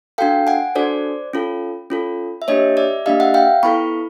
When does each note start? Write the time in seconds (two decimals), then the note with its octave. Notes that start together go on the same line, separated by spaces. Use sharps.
0.18 D4 F#4 A4 F5 G5
0.47 F#5 G#5
0.75 D4 F#4 A4 C5 D5
1.33 C#4 F4 A4
1.90 C#4 F4 A4
2.42 E5
2.48 A#3 D4 G4 C#5 D#5
2.77 D5 E5
3.06 A#3 D4 G4 D#5 F5
3.20 E5 F#5
3.34 F5 G5
3.63 B3 E4 A4 B5 C#6